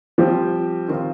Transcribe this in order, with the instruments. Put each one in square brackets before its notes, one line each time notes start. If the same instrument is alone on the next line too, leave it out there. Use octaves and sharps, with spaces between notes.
[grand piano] F3 [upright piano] G3 C4 G4
[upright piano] D#3 C4 F4